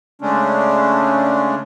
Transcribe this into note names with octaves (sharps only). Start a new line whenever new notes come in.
C#3 G#3 A3 C#4 D4